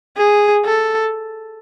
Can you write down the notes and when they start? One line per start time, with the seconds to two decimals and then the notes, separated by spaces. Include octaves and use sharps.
0.17 G#4
0.65 A4